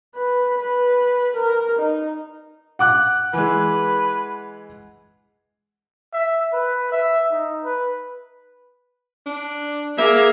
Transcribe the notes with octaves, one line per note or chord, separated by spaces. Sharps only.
B4
B4
A#4
D#4
F#5 D6 F#6
E3 G#3 B4
E5
B4
E5
D#4
B4
D4
A#3 G#4 E5